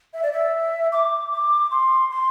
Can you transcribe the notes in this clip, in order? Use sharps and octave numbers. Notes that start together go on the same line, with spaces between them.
E5
D5
E5
D6
D6
C6
C6